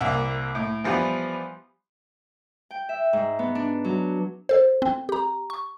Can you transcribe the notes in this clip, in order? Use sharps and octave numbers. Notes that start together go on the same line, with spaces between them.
C2 A#3 E5
A2
E3 F3 G3 B3
G5
E5
G#2
B3
D4
F#3
A4 C5
C4
G4 A#5
C#6